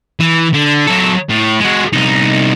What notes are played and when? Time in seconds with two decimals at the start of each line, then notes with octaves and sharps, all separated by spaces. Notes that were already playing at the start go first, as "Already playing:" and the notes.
0.20 E3
0.53 D3
0.87 F#3 A4
1.29 A2
1.61 G#3 F#4
1.93 C2 D#4